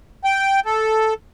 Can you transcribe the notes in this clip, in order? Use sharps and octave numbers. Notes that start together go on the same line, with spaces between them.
G5
A4